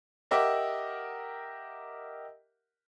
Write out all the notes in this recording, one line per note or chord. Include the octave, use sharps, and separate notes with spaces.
G4 A#4 D#5 E5 F#5 D6